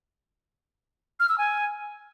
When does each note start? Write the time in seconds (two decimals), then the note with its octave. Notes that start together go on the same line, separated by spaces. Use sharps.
1.20 F6
1.29 E6
1.38 G#5